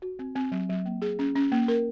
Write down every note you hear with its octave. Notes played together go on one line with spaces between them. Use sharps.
F#4
C4
C4
F#3
F#3
A#3
G#4
C#4
C#4
A#3
A#4